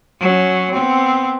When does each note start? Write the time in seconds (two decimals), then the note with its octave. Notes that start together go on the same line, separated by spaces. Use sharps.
0.20 F#3 C#4
0.72 B3 C4